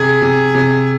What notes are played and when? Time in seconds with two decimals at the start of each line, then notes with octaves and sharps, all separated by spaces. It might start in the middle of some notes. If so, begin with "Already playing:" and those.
Already playing: C3 G#4
0.22 C3
0.55 C3